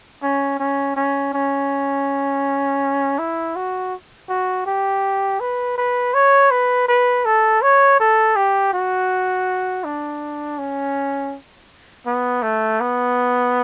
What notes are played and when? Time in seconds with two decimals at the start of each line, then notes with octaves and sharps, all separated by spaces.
0.22 C#4
0.60 C#4
0.97 C#4
1.34 C#4
3.19 E4
3.56 F#4
4.29 F#4
4.66 G4
5.41 B4
5.78 B4
6.14 C#5
6.51 B4
6.88 B4
7.25 A4
7.62 C#5
8.00 A4
8.36 G4
8.73 F#4
9.84 D4
10.58 C#4
12.06 B3
12.42 A3
12.80 B3